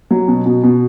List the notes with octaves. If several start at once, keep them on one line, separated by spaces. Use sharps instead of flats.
F#3
B2
B2
B2